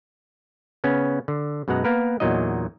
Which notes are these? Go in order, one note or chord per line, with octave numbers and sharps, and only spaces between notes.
C#3 B3 C#4
D3
F#2 B2 G#3 F#5 A#5
A#3 B3 A#4 B4
E2 A#2 F#3 D#4 D#5